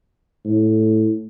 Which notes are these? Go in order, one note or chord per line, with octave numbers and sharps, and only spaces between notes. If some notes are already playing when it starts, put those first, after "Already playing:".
A2